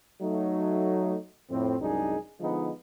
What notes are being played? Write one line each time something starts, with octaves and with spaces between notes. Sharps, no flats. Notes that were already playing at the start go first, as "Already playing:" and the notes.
F#3 A3 D#4
F2 A2 C4
C2 F#2 G#3 D4 D#4 G#4
D3 F3 G#3 B3 D#4